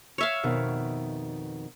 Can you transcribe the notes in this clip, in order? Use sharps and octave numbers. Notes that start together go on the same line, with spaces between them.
C#5 E5 F5
F2 B2 D#3